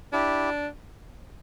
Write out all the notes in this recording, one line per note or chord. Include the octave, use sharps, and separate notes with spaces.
D4 E4 G4